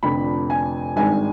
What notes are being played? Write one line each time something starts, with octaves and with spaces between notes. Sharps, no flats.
F1 F2 D3 B5
G#5
G#1 G2 D#3 G#3 G#5